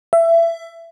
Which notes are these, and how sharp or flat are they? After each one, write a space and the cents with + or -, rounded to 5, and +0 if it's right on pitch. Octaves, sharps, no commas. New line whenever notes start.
E5 +20